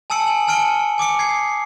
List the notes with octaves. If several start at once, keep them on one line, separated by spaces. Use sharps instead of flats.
G#5 A5 D#6 E6 C#7 F#7
G#5 F#7
G#5 A5 F6 C#7 D7 G7
G#5 D6 D#6 C#7
G#6 C7 C#7